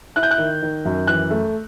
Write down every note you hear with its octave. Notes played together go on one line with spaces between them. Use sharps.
E4 F#6
G6
F#6
D#3
D#3
F#2
E3 F#6
A3